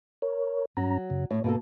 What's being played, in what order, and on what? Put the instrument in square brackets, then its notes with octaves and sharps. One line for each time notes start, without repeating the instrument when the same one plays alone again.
[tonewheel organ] A#4 C#5
[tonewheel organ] G2 C#4 A#5 [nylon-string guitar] F#3
[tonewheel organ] F#2 C#3
[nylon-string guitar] A2 [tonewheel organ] C#5
[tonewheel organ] G#2 [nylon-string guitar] B2 A#3 A4